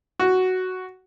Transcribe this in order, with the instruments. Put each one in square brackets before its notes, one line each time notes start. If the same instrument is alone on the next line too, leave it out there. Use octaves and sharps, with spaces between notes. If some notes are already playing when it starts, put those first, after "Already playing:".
[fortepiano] F#4